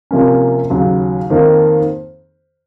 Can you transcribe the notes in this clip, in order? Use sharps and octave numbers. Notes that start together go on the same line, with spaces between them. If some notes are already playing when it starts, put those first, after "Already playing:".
C3 F3 A#3 C#4
D#2 C#3 F#3
F2 D#3 A#3 D#4